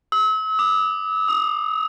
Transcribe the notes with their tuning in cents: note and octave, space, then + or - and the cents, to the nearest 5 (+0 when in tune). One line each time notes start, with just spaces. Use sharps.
E6 -40
D6 +30
D#6 +5